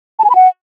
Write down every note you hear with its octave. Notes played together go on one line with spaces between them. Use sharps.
A5
G#5
B5
F#5